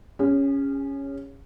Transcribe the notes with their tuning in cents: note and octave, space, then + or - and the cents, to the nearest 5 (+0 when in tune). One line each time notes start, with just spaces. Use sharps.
C#4 +0 G#4 -40